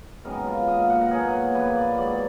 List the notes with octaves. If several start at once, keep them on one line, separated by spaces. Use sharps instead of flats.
F#2 D#3 G#3 B3 A#4
F4
B2 A#3 D#5
F5
F#5
A#4
B2 F#3 A#3 G#4
A#2 F3 A#3 B4
D5
G#2 F#3 B3 D5